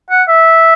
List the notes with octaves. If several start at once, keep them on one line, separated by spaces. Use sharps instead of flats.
F#5
E5